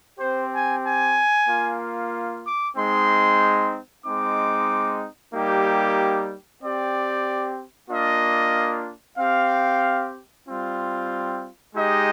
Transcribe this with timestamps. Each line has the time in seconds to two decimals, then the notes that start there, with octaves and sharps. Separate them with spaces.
0.19 C4 G4 C5
0.52 G#5
0.84 G#5
1.47 A#3 F4
2.44 D6
2.76 G#3 C4 D#4 C6
4.05 G#3 C4 D#4 D6
5.33 G3 A#3 D#4 G4
6.61 C4 G4 D5
7.90 A#3 D4 F4 D#5
9.18 C4 G4 F5
10.47 G3 C4 F4
11.74 G#3 D#4 G4 D#5